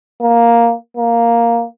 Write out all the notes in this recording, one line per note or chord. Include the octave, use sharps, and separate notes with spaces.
A#3
A#3